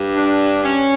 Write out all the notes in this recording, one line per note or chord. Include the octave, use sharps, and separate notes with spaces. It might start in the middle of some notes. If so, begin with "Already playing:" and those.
Already playing: G2
D4
C#4